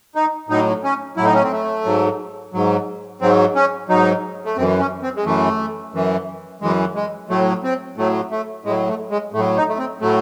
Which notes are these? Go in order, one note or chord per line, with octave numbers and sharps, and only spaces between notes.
D#4
A2 F#3 D#4
C#4
A2 F#3 E4
D#4
C#4
C4
A3
G#2 F#3
G#2 F#3
G#2 F#3 C4
C#4
G#2 F#3 D#4
A3
F#2 E3 C4
C#4
C4
G#3
F#2 E3 A3
F#2 E3
F#2 E3 G#3
G#3
A2 F#3 A3
C4
A2 F#3 A3
A3
A2 G#3
F#3
A3
G#3
A2 A3
F#3
D#4
A3
C4
A2 F#3 A3